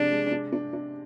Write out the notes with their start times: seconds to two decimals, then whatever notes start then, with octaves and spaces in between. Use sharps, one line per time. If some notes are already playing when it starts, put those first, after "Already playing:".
Already playing: C3 F3 G#3 D4
0.11 G#3
0.32 D4
0.52 D4
0.73 D4